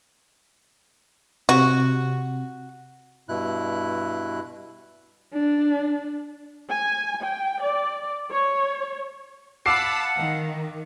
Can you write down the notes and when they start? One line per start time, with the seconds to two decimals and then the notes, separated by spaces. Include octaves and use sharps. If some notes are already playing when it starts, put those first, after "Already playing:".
1.49 C3 F#4
3.29 G2 B2 E4 F#6
5.34 D4
6.70 G#5
7.22 G5
7.62 D5
8.29 C#5
9.66 F5 F#5 A5 B5 D6 E6 C7
10.16 D#3